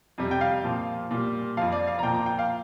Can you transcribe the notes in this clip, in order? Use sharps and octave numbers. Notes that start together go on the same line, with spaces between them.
F2 C3 G3
G5
F5
A#2 F3
A#2 G3
F2 F3 F5
D5
F5
A#5
A#2 F3 G5
A#5
G5
F5